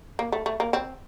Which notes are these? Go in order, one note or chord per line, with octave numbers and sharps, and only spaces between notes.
A#3
A3
A3
A#3
C4